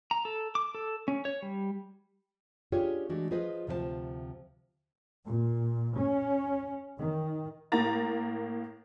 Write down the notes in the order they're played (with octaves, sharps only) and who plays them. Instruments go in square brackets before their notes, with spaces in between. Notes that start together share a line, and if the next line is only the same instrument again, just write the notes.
[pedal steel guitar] A#5
A4
D6
A4
C#4
C#5
G3
[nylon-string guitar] C#4 D4 F4 G4 G#4 C#5
E3 G#3 A3 D4 F#4
F3 F4 G#4 B4 C5 D#5
D2 C3 F3 G#4 C5 A5
[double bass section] A#2
C#4
D#3
[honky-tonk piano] A2 A#3 A#5 A6